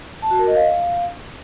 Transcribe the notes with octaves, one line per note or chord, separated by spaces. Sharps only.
A5
F#4
A#4
D#5
F5